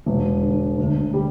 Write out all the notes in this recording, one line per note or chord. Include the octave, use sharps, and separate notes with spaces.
E1
D3
D2
G3